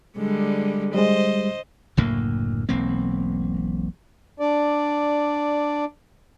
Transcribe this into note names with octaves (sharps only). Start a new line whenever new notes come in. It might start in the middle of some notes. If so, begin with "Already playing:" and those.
D3 G3 G#3
G3 G#3 C5 D#5
F#1 D2 A2 A#3
E1 B1 A#3 C4
D4 D5